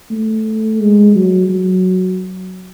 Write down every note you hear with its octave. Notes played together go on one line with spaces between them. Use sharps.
A3
G#3
F#3
F#3